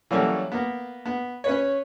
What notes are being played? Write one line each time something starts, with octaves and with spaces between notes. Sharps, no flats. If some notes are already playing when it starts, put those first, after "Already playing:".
E3 F#3 G3 A#3 C#4 A4
A#3 B3
B3
C#4 B4 C#5